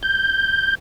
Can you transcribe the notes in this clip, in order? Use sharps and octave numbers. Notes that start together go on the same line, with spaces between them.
G6